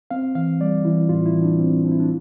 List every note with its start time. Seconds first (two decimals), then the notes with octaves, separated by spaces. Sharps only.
0.11 C4 F5
0.35 E3 F5
0.60 G3 D5
0.85 E3 E4
1.09 A2 F4
1.26 E4
1.34 E3
1.43 D4
1.59 C4
1.84 C4 D4
1.91 E4
2.00 D4